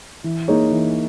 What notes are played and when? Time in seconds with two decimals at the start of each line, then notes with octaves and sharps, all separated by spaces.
0.24 E3
0.48 A#3 D#4 G#4 C#5
0.71 E3